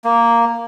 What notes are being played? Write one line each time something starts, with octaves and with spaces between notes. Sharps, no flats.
A#3